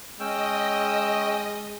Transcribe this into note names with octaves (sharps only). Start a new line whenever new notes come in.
G#3 C#4 D#5 G5 E6